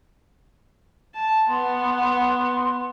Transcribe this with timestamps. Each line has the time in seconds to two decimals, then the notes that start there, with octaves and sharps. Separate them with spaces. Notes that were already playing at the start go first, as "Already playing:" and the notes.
1.15 A5
1.48 B3 C6